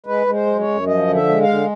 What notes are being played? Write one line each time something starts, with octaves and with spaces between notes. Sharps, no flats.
G#3 B4
G#3
C5
F#2
C#5
F#2
F3 D#5
D3
E5
G#3
F5
D3